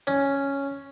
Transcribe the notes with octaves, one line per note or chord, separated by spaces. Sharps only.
C#4